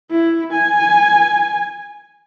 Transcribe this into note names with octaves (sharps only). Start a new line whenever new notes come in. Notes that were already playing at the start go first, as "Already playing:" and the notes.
E4
G#5